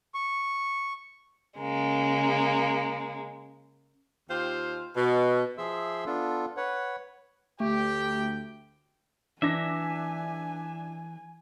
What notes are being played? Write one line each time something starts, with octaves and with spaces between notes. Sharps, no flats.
C#6
C#3 G#3 A#3
D#2 F4 G4 C5
B2
F3 G#4 E5 C6 E6
B3 D4 F4 A4
B4 C#5 F#5
D2 A3 G4 G5
E3 D4 E5 G#5 A#6